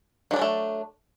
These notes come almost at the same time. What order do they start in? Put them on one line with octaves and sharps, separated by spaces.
D#3 D4 F#3 G#3 A3